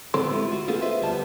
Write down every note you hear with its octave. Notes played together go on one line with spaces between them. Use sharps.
A2 D3 B3 C4 A4 C6
G#3 E4 F4 G4
F4 F#4
A3 B3 C#4 F4 G#4 A4
F4 B4 C5 D#5 E5
D2 G3 B3 A5